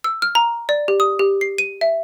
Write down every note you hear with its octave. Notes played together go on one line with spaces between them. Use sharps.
E6
F6
A#5
D5
G4
D#6
G4
C7
D#7
E5